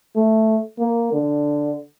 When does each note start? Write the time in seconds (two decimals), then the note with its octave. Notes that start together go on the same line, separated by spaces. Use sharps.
0.16 A3
0.79 A#3
1.13 D3